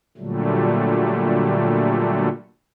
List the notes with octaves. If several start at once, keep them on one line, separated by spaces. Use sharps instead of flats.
A#2 D3 F#3 G3 A3